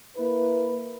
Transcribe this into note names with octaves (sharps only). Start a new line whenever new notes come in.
A#3 E4 B4